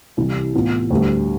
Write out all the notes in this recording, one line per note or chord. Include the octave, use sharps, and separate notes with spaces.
C2 C3 E3 G3
A2 E3 B3 F4
D2 D3 G3